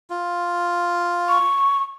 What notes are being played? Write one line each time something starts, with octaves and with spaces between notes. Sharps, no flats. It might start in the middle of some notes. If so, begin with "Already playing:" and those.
F4
C#6